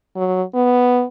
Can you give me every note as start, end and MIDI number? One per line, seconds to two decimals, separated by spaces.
0.17 0.43 54
0.55 1.04 59